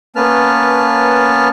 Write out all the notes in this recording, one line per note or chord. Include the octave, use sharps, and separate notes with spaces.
A#3 B3 C#4 B4 A5 F6